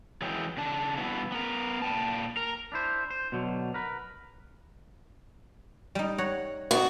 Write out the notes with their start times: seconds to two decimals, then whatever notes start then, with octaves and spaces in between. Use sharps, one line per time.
0.21 E3 F#3 G#3 C#4 E4 G5
0.57 C#3 D4 A5
0.97 G2 B2 E3 B3 E4
1.32 B3 A#4
1.82 A#2 G5 A5
2.37 A#4
2.72 D4 E4 C5
3.10 C5
3.32 B2 D3 F#3
3.74 A#4 B4
5.95 G3 D#4
6.18 C#5 F#5 A#5
6.71 C4 D#4 F#4 D5